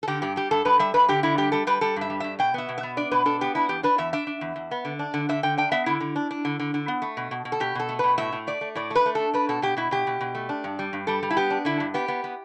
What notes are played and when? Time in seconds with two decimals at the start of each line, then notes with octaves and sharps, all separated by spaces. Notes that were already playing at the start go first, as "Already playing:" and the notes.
0.03 A4
0.08 D3 G4
0.22 G2 G4
0.36 G3 G4
0.51 G2 A4
0.65 G2 B4
0.79 G3 E5
0.94 G2 B4
1.09 D3 G4
1.23 D3 E4
1.38 G3 G4
1.52 G3 A4
1.67 G3 B4
1.81 G3 A4
1.96 G2 E5
2.10 G3
2.20 G2 E5
2.39 B2 G5
2.54 B3 E5
2.69 B2
2.78 E5
2.83 B3
2.97 D4 D5
3.11 B2 B4
3.25 D4 A4
3.41 B3 G4
3.55 D4 E4
3.69 E2 G4
3.83 D4 B4
3.98 E2 E5
4.13 D4 E5
4.27 D4
4.41 E2
4.56 E2
4.71 B3
4.85 D3
4.99 D4
5.14 D3
5.29 D3 E5
5.43 D3 G5
5.57 D4 G5
5.72 B3 E5
5.86 D3 E4
6.00 D3
6.16 D4
6.31 D4
6.45 D3
6.60 D3
6.74 D3
6.88 B3
7.02 A3
7.17 B2
7.31 B2
7.45 B2
7.52 A4
7.60 B2 G4
7.75 B2 A4
7.89 A3
7.99 B2 B4
8.18 A2 E5
8.33 A2
8.47 A3 D5
8.61 A3
8.75 A2 D5
8.90 A3
8.95 B4
9.06 A3
9.15 D4 A4
9.33 D4 B4
9.49 B2 A4
9.62 B2 G4
9.77 B2 E4
9.91 B2 G4
10.07 B2
10.21 B2
10.35 A3
10.49 D4
10.64 G2
10.79 G3
10.93 G2
11.07 G3 A4
11.23 G3
11.30 E4
11.37 B3 G4
11.50 D4
11.65 D3 E4
11.80 G2
11.94 B3 G4
12.08 B3
12.24 B3